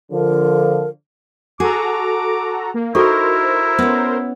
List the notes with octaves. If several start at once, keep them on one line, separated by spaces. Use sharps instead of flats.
D3 F3 A#4
F#4 G#4 A4 A#5 D6
A#3
D#4 E4 F#4 A4 A#4 C5 C#6
B3 C#4